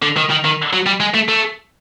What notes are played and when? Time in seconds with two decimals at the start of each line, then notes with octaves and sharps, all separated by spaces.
0.02 D3
0.17 D#3
0.30 D#3
0.45 D#3
0.73 F#3
0.86 G3
1.00 G#3
1.14 A3
1.29 A3